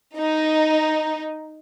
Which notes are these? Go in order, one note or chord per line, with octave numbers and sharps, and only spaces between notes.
D#4